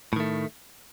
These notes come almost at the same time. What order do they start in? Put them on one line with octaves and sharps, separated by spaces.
A2 D#3 A3